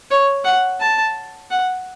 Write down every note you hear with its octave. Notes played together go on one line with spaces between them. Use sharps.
C#5
F#5
A5
F#5